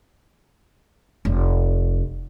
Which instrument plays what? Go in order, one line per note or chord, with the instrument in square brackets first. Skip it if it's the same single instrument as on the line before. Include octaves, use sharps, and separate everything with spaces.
[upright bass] F1